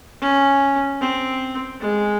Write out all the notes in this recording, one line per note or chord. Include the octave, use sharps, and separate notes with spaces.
C#4
C4
G#3